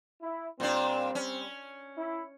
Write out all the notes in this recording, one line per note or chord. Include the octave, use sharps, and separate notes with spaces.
E4
A#2 G3 C4 D4
C#4
E4